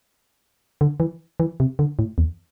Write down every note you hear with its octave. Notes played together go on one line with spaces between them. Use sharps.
D3
E3
E3
C3
D3
A2
E2